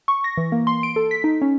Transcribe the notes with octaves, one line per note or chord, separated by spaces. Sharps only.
C#6
A#6
E3
A#3
C6
D7
A4
B6
D#4
C#4